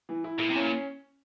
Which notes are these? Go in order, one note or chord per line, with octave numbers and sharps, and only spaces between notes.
E3
E4
A#2 E4
C3
A#2 C#4